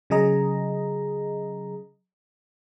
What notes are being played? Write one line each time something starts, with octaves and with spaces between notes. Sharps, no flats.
C#3 F#3 G#4 D#5 A#5